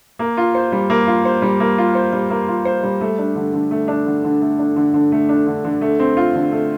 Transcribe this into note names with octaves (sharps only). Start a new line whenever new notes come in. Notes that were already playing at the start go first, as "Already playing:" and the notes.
A#3
F4
C5
G3
A#3
F4
C5
G3
A#3
F4
C5
G3
A#3
F4
C5
G3
A3
D4
D3
D3
A3
D4
D3
D3
A3
D4
D3
D3
A3
D4
D3
D3
A3
C4
F4
D3
A3